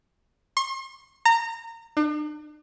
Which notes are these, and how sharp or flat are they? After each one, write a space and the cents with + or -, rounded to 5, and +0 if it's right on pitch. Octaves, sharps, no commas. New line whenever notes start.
C6 +45
A#5 -25
D4 +45